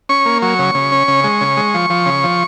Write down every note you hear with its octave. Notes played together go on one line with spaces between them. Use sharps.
C#4 C#6
A#3
F#3 C#6
C#3
C#3
C#4
C#3
G#3
C#3
G#3
F3
F3
C#3
F3